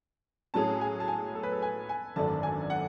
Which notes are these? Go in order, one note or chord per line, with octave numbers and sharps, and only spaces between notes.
A2 F#3 C#4 G#4 A5
G#5
A5
G#5
A4
B4
A4
G#5
G#5
G#1 F#2 D3 A3 D4 A5
G#5
F#5